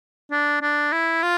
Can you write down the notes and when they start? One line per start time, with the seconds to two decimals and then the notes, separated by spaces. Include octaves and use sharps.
0.31 D4
0.61 D4
0.92 E4
1.23 F4